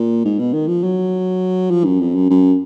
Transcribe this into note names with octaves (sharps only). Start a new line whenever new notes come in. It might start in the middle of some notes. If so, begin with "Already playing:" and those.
Already playing: A#2
G#2
B2
D#3
F3
F#3
F3
F#2
F2
F#2
F#2